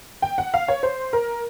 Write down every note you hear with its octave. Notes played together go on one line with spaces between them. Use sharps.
G5
F#5
F5
C#5
C5
A#4